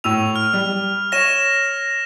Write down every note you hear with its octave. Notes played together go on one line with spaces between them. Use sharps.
A2 E6 D#7 F7
F6
G3
C#5 A#6 D#7 E7